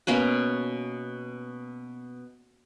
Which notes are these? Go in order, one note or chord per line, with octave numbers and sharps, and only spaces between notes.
B2 A#3 C#4 B4